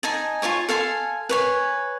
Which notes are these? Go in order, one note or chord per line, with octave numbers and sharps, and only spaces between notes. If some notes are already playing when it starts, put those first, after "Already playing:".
D#4 G#5 A5
F4 C#5 G#5 C#6
A4 F5 G#5 C6
B4 C#5 G#5